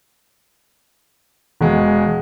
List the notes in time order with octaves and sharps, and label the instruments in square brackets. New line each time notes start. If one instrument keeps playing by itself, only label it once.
[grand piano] E1 G#3